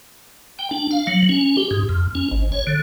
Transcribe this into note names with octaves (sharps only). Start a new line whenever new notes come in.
G5
D4
F5
F#3
C#4
G4
G#2
F2
C#4
G#1
C#5
D3